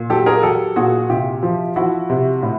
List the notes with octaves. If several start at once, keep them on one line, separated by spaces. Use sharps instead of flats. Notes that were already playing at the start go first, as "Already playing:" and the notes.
Already playing: A#2
F#3 G4 A4
G#4 A#4
F#3 G4 A4
A#2 F#4 G#4
C3 F4 G4
F3
F3 E4 F#4
C3
A2